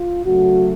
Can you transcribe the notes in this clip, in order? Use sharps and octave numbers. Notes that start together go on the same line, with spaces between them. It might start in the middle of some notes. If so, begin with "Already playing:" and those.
Already playing: F4
C#3 F#3 A3 F#4